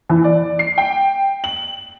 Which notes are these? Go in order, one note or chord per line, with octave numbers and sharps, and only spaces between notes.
E3
D5
C7
G5
F#7